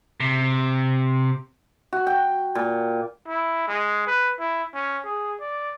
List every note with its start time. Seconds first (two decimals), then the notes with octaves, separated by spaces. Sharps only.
0.20 C3
1.93 F#4
2.07 G5
2.55 A#2
3.28 E4
3.68 G#3
4.07 B4
4.40 E4
4.74 C#4
5.04 G#4
5.40 D5